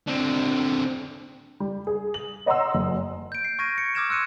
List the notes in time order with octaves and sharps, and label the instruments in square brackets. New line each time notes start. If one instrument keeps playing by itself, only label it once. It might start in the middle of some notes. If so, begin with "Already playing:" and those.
[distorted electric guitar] D3 C4
[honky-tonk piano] G3
G#4
F#7
C#5 D#5 F#5 A#5 C6 E6
F#1
[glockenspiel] G6 D7
C7
C#6 F6 G#6 A#6 C7 D#7
C#7
D6 E6 F6 G#6 A#6 E7
C6 E6 F#6 C#7 D#7 E7